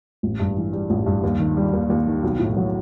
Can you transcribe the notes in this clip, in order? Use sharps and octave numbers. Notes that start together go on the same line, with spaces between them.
A1
G2
E3
G3
A1
G2
D#2
D#3
G3
D#2
D#2
D#3
B1
A2
F#3